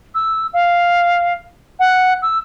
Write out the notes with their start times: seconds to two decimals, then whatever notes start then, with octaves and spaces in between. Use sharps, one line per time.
0.15 E6
0.53 F5
1.79 F#5
2.22 E6